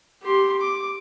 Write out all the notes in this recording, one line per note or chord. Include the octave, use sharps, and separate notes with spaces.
G4 C6
D6